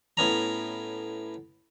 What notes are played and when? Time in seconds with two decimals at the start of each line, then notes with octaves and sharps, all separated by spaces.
0.17 A2 B3 C#4 A#5